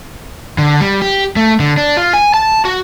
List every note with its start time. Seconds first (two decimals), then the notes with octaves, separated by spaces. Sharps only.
0.58 D3
0.81 G3
1.02 G4
1.36 A3
1.60 D3
1.77 D4
1.97 F4
2.13 G#5
2.34 A5
2.65 F#4